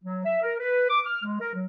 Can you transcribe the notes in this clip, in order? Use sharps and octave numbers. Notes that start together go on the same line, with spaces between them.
F#3
E5
A#4
B4
D6
F6
G#3
A#4
F#3